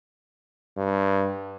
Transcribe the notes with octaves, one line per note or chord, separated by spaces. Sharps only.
G2